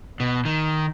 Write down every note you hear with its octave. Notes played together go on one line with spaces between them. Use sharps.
B2
D#3